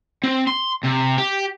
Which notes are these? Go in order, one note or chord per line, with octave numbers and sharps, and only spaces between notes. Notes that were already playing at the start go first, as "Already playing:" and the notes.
C4
C6
C3
G4